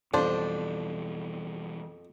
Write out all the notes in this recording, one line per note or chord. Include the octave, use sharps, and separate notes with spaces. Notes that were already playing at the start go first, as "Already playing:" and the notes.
F2 B2 E3 G3 D4 C5